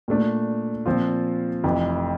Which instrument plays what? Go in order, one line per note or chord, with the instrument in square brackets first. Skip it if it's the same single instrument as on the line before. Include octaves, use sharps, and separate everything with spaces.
[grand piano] A#2 A3 D4
A#2 F3 C4 F4
F1 F2 E3